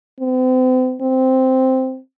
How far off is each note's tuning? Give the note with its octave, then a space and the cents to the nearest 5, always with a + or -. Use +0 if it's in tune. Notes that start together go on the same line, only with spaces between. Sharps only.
C4 -40
C4 -5